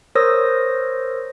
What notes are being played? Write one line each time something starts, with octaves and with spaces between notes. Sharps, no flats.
A#4 C5 C#5 D#6 E6 A#6